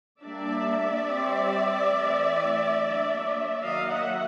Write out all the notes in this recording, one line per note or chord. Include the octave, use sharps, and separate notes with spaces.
G3 A#3 D4 D5 E5
G3 C4
E3 A3 C4
F#3 A#3 D4
D#3 F#3 A#3 D#5 F5
E5 F#5